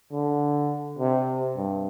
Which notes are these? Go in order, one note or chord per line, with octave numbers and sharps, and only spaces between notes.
D3
C3
G2